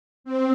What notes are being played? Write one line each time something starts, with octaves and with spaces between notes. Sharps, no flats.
C4